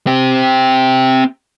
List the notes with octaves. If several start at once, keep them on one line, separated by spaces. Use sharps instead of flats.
C4 G4